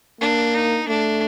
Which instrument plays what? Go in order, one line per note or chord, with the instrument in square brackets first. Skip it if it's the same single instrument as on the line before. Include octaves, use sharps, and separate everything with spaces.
[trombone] A#3 [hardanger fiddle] D4
[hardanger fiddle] D#4
[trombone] A3 [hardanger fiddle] D4